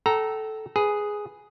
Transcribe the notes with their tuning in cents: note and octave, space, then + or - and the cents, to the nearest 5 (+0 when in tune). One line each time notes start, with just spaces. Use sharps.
A4 -10 G5 -35 A#5 +0
G#4 +0 B4 +0